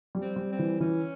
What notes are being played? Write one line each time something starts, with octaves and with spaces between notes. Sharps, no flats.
G3
C4
G3
C4
E3
E3 C#4